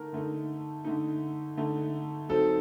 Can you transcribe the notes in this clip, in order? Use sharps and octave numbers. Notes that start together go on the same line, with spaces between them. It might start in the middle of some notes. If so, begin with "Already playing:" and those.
Already playing: D3 A3 D#4 A#4
D3 A3 D#4
D3 A3 D#4
D3 A3 D#4
F#3 C4 D#4 A4